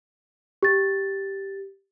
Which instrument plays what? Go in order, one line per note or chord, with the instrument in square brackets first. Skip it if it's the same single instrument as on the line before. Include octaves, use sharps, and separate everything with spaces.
[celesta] G4 A6